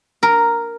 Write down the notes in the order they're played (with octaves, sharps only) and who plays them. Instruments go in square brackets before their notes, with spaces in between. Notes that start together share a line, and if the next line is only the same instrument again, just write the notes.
[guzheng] A#4